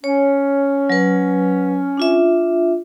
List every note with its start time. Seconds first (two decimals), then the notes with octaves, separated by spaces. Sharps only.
0.04 C#4 C#5
0.90 F#3 B4
1.97 D4 F4 E5